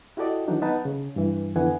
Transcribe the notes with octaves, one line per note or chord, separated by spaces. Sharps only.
E4 F#4 G4 A4 D5 D#5
D#3 E3 F#3 D4 D#4
B3 D#4 B4 F#5 A5
C#3
G2 E3
F2 D3 E3 B3 F#5 G#5